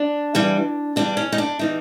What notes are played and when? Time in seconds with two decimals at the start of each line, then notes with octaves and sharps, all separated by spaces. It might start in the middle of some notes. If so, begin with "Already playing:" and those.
Already playing: D4
0.35 G2 E3 G3
0.96 G2 E3 G3 D4
1.17 C#4
1.32 D#4
1.38 D4
1.59 E3 G3 D#4